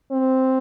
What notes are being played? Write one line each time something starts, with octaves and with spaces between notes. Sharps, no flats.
C4